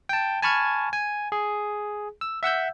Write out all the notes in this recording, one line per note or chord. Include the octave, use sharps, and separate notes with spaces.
G5 A5
G#5 A5 B5 C#6 F6 G#6
G#5
G#4
E6
E5 F#5 E6 G6